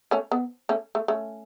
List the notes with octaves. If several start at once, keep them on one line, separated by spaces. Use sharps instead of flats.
A3 C#4
B3
A3 C#4
A3
A3 C#4